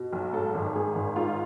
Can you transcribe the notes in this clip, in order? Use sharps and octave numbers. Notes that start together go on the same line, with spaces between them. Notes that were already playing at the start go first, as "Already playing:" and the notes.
Already playing: B2
B1
G#2 A4
G#1
G#2 G#4
G#1
G#2 F4